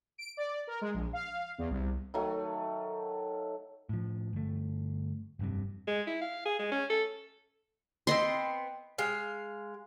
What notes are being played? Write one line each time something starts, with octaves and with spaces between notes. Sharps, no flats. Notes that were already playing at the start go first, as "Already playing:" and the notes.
D7
D5
A#4
G#3
A#1
F5
E2
C2
D#3 F#3 A3
A2 F3
G1 A3
F1 G2 C3
G#3
E4
F5
G#4
G#3
C#4
A4
B3 C4 D#5 C6
G#3 F5